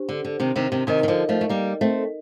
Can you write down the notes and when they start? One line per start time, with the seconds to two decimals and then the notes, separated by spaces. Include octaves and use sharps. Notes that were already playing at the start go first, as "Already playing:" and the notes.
Already playing: D4 G4 C5
0.09 D3
0.25 D3
0.40 C3 D#3
0.56 C3 D#3
0.72 C3 D#3
0.87 C3 D#3 D#4 A#4 D#5
1.03 D#3
1.08 D3 F3
1.29 F3 A3
1.41 A3
1.49 G3 A#3
1.81 A3 C4